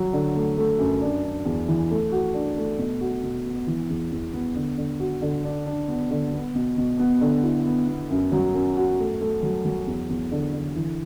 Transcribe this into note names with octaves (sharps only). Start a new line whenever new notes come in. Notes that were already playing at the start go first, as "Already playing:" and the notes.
Already playing: F#3
D3
A3
A3
F#2
D4
D4
E2
E3
A3
F#4
D4
A3
B2
F#4
B2
B3
E3
E2
E2
B3
D3
D3
F#4
D3
D4
D4
B3
D3
B3
B2
B2
B3
D3
E4
B3
B3
F#2
F#3
F#2
F#4
A3
A3
F#3
F#3
E2
E2
D3
D3
E3